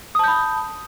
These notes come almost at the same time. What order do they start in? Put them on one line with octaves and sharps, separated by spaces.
D#6 A5 G6 B5